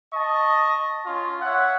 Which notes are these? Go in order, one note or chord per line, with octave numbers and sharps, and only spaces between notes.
D#5 A5 C#6
C#4 F4
C#5 E5 F#5